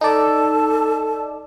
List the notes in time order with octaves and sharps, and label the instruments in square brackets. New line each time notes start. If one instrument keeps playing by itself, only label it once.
[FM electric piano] D#4 D5 [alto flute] A4 [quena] A5